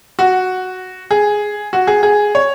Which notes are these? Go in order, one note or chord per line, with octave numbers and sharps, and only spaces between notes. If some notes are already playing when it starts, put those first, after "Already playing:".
F#4
G#4
F#4
G#4
G#4
C#5